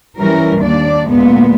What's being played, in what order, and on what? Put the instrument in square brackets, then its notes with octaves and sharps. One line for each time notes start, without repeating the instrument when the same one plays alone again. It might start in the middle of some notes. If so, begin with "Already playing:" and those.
[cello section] E3 G3 C#4 A#4
D#2 D4 D5
D2 A#2 G#3 B3